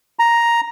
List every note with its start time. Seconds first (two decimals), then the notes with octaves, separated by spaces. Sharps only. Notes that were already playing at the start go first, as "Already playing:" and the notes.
0.19 A#5